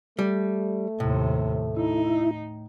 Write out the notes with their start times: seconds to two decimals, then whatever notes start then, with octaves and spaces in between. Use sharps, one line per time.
0.19 G3 A3
1.00 D#2 A2 C3
1.77 D#4 E4